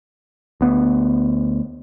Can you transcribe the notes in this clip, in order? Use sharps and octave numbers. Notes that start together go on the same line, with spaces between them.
D2 B3